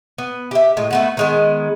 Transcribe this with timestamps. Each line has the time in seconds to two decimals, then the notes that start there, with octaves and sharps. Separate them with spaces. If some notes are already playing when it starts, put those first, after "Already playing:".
0.18 B3
0.51 G4 E5
0.77 A2 G#3
0.91 A3 B3 F#4
1.17 D#3 G#3 B3